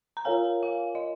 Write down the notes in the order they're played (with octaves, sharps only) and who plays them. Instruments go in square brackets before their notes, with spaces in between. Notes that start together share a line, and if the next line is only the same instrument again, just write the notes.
[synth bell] A#5
[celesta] F4 A#4 C#5 F5 [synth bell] G#5
[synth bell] F5
D#5